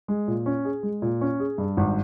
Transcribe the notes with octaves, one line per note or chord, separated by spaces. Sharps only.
G#3
A#2
C#4
G#4
G#3
A#2
C#4
G#4
G2
G#1